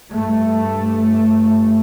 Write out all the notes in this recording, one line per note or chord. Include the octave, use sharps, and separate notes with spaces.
G2 A3